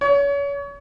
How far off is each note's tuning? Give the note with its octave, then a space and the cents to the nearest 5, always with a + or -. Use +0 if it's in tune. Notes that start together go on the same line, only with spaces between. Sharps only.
C#5 +35